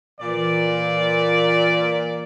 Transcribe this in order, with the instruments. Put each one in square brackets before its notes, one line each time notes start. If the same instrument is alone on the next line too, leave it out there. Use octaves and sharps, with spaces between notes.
[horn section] A#2 D5 [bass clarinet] E3